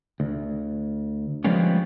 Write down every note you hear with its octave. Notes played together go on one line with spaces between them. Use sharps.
D2
F3 G3 G#3 A#3 B3 C#4